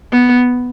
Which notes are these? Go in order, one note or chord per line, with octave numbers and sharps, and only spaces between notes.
B3